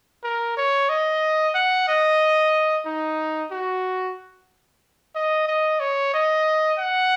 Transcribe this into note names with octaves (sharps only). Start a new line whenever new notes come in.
A#4
C#5
D#5
F#5
D#5
D#4
F#4
D#5
D#5
C#5
D#5
F#5